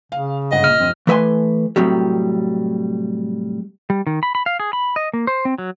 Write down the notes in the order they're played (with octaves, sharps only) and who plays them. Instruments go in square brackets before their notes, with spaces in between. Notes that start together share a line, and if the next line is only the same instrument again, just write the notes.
[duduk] C#3 [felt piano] F5
[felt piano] G1 G#3 F#5 [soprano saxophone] D#5
[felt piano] A#2 D#7 [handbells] F6
[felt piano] F1 F3 [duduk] C4
[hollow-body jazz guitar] E3 A3 B4 E5 G#5 C6
A2 C3 F#3 G3
[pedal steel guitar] G3
D#3
B5
B5
F5
G#4
B5
D#5
A#3
C5
C4
F#3